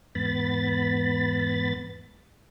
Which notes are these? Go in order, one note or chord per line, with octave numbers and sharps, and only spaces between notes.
E2 G#2 B3 B5 A6